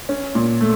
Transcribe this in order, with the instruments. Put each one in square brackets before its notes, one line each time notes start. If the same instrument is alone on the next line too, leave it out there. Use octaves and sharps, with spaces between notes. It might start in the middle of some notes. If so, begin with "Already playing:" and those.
[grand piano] C#4
A#2
A3